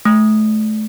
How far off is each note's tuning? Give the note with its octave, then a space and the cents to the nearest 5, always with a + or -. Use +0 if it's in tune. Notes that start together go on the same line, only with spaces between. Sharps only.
A3 -30